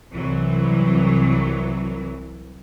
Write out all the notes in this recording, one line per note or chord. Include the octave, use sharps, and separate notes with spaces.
C2 E3 F#3